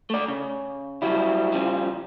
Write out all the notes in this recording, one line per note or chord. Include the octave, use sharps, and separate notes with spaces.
A3 D5
C#3
F#3 G3 E4
C#3 F3 G3